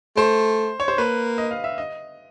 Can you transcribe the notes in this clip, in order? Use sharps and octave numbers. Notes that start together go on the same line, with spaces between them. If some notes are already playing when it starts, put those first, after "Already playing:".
A3 C5
C#5
C5
A#3 B4
D#5
F5
E5
D#5